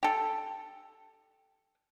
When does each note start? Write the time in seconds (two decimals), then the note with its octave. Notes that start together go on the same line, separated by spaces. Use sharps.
0.03 G4 A4